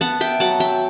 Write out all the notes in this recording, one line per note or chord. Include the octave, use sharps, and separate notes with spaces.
B3 F#5 A5
E5 G5
F#3 F#5 A5
E5 G5